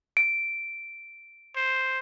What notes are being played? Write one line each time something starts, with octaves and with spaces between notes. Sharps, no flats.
D7
C5